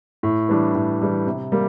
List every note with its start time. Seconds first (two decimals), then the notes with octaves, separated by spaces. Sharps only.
0.23 A2
0.49 E3 G3 D4
0.75 A2
1.01 E3 G3 D4
1.27 C3
1.52 G3 A#3